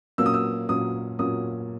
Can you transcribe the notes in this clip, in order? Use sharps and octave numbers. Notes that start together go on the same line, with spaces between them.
A#2 F#3 A#3 C#4 E6
D#6
E6
A#2 F#3 A#3 C#4 D#6
A#2 F#3 A#3 C#4 D#6